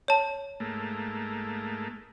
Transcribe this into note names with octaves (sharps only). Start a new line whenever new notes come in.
C#5 A5
G#2 A3 A#3